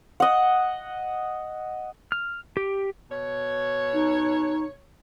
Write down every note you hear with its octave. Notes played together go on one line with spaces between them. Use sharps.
D#5 F#5
F6
G4
B2 C#5
D#4